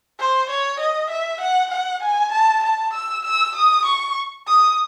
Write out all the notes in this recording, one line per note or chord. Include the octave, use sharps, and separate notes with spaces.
C5
C#5
D#5
E5
F#5
F#5
G#5
A5
A5
E6
E6
D#6
C#6
D#6